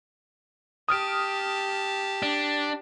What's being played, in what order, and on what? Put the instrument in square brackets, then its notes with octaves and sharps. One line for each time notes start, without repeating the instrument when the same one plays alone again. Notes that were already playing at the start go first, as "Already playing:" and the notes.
[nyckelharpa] G4 A5 [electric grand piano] D#6 F6 D7
[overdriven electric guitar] D4